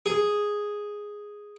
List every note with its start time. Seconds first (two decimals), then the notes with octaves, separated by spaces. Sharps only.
0.06 G#4